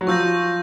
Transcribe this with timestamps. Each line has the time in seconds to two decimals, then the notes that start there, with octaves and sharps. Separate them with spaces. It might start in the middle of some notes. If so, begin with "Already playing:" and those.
0.01 F#3
0.07 F3 C#6 E6 G6 A#6